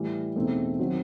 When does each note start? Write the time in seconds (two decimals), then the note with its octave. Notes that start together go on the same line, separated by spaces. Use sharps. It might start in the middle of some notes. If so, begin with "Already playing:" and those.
Already playing: A2 E3 G3
0.36 E2 B2 A3 C4 D#4
0.79 D#3 F#3 C4 F#4